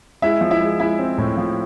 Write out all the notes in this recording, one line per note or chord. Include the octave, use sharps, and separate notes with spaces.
G#3 E4 E5
F3
E4 E5
G#3
G#3 E4 E5
C4
A2
F3